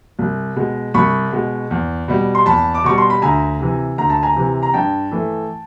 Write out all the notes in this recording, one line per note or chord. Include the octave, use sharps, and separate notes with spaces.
C2
B2 G#3
C2 B5 C#6
B2 G#3
E2
B2 G3
C6
E2 A5 B5
D6
B2 G3 C#6
C6
B5
D2 G#5 A#5
C3 E3
D2 A#5
A5
G#5 A#5
C3 E3
A#5
G2 G5 A5
E3 A3